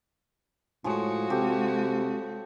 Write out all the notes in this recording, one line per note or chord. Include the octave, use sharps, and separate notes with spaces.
A2 F3 G#3 F#4 G#4 C#5
C3 G4 A4